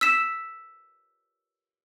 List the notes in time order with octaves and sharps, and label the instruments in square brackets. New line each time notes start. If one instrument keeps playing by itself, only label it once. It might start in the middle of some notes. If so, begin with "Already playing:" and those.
[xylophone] E6 B6 E7